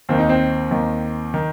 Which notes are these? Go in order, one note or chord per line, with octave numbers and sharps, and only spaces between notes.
D#2 D#3 C4
D#4
C4
D#2 D#3
D#3